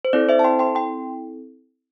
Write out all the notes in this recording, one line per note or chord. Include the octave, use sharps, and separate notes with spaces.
C5
C4 E4 A4 D5
C5 E5
A5
G5 C6
G5 C6
G5 C6